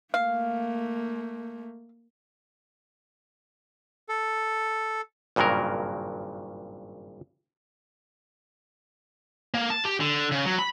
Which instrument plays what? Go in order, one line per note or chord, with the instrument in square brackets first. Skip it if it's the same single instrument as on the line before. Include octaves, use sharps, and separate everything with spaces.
[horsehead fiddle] A3 A#3 [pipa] F5
[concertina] A4
[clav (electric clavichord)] G#1 G2 A#2 C#3 F#3 A#4
[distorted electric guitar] A#3
A5
G4
D3
C#3
F#3
B5